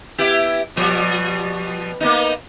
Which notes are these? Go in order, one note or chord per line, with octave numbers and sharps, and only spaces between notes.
B3 E4 G4
B2 F3 G3
A#3 B3 D#4